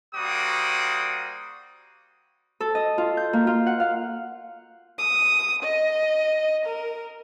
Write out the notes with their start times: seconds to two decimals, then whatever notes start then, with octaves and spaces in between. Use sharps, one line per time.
0.15 G3 A#3 F#4 C5 D6 D#6
2.60 A4
2.75 D#5
2.98 F4
3.17 G6
3.33 A#3
3.47 F4
3.66 F#5
3.80 F5
4.99 D#6
5.63 D#5
6.66 A#4